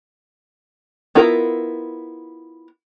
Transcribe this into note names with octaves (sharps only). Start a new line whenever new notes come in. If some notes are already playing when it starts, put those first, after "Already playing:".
B3 E4 F4 A#4